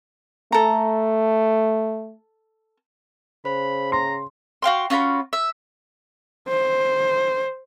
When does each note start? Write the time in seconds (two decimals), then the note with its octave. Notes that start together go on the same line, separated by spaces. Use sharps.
0.52 A3 A4 A#5
3.45 C#3 C5 B5
3.92 A#5 C6
4.62 F#4 F5 G5 C6
4.90 C#4 F4 F#4 B5
5.33 E5
6.48 C5